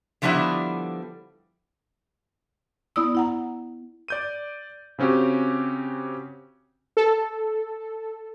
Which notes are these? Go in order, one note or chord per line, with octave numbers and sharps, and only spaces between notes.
D3 F3 G3 B3 D4 E4
B3 E4 D5 D#6 E6
E4 F#5 A#5
D5 G6 D#7
C#3 C4 C#4 F#4 G4
A4